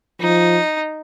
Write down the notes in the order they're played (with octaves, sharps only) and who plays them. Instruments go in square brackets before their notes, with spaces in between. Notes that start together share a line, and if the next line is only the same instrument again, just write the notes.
[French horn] F3 [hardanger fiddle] D#4